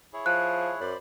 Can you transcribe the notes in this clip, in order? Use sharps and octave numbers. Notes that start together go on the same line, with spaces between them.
E4 G#4 C#5
F3 F#6
F#2 C5 D5 B5